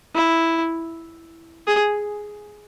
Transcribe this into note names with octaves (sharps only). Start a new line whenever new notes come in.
E4
G#4